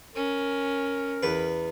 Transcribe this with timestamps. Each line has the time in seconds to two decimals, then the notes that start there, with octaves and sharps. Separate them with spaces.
0.15 C#4 A#4
1.23 E2 B4